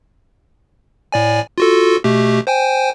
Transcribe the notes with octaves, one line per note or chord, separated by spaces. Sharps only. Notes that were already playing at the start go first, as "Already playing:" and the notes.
A2 D5 G#5
F4 F#4 A4
B2 A3 G4
C5 G5 G#5